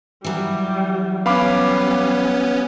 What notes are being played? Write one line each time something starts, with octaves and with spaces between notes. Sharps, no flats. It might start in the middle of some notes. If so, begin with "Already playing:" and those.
E3 F#3 G3
G3 B3 C#4 F5 B5 D6